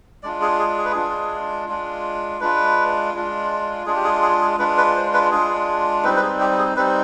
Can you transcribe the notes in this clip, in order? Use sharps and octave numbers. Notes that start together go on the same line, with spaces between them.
G#3 D4 F4 D5
G#4
G#4
G#4
B4
G#3 D4 F4 G#4
G#3 D4 F4
G#3 D4 F4 B4
G#3 D4 F4
G#3 D4 F4 G#4
G4
G#4
G#4
G#4
G#3 D4 F4 B4
B4
C5
B4
G#3 D4 F4 G#4
G3 C4 D#4 B4
B4
G#4
G4
G#4
G3 C4 D#4 B4